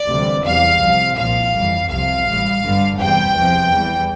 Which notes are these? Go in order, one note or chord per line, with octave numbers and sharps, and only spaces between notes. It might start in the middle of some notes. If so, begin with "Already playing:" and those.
Already playing: D5
D2 C3 E3 G3
E2 C3 E3 G3 F5
C2 C3 F3
C2 A#2 F3 F5
G1 F2 E3 G3
C2 C3 F3 F5
A1 A2 G3
G1 G2 D3 G3
E2 C3 G3 G5
E2 C3 F3
E2 E3 G3